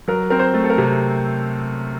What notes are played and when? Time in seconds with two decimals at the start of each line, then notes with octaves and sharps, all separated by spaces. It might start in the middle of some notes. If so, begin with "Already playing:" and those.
0.08 F#3 A#4
0.30 C4 A#4
0.39 C5
0.54 A3
0.64 A4
0.70 A#4
0.78 C3